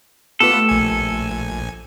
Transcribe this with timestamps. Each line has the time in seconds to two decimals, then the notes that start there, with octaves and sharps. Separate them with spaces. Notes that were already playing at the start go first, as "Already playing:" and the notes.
0.40 A3 B3 F4 G4 A4 B4
0.69 A#1 G#5